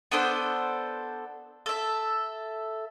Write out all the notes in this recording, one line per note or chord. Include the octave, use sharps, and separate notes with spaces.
B3 D4 A4 C5
A4 E5